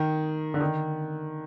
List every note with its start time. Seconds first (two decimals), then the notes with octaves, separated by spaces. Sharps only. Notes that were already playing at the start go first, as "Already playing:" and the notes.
Already playing: D#3
0.54 D3
0.60 D#3